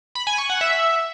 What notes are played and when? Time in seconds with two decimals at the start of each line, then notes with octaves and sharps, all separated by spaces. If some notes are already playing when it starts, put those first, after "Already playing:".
0.15 B5
0.27 G#5
0.38 C#6
0.50 F#5
0.61 E5